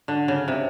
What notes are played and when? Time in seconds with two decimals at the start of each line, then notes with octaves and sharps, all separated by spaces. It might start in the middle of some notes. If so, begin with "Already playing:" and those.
0.08 D3
0.28 C#3
0.48 C3